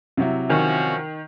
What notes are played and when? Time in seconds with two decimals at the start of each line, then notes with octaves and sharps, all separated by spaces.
0.17 C3 F#3 E4
0.50 D#3 F3 C#4 F#4